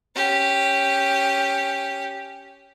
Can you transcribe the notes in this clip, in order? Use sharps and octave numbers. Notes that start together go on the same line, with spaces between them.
C#4 G4